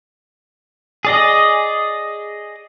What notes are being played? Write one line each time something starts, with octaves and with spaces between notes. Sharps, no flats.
G#4 D5 D#5